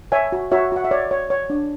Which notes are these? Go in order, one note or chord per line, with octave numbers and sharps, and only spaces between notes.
C#5 E5 G#5
F#4
F#4 C#5 E5
F#4 F#5
E5
C#5 D5
C#5
C#5
D4